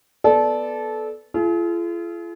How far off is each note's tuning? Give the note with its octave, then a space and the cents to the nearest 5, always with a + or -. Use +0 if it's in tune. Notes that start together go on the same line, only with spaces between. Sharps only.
B3 +0 A4 -20 D5 +0
F4 -40 G#4 +40